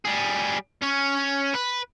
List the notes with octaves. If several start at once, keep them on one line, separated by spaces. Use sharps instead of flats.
G3 G#4
C#4 C#5
B4